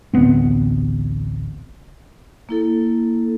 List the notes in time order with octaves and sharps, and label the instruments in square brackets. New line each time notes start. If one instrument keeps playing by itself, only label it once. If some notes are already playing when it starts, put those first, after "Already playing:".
[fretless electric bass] A1 D2 B3 C4
[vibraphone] A#3 E4 A4